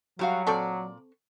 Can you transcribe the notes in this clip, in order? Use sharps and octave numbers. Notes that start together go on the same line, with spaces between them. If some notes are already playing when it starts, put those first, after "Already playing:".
F#3 G3 F#4 F5
A#2 C4 A4 D5 C#6